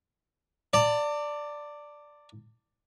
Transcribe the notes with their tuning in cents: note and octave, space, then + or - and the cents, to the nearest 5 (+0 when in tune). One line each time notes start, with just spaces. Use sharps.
D5 +0 A5 +40